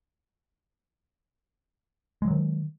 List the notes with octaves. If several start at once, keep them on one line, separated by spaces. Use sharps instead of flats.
D#3 E3 F#3 G#3